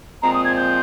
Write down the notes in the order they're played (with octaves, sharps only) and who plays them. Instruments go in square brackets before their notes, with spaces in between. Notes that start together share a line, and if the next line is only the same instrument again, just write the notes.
[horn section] A#2 F3 G#3 C4 [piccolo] A#5
[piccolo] D#6
G#6
G6